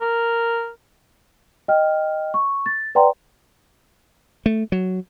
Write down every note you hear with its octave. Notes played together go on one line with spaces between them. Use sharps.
A#4
D#5 G5 F6
C#6
A6
B4 D5 F#5 G5 A#5 C6
A3
F#3